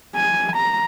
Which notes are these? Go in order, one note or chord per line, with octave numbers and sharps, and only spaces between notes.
G#5
A#5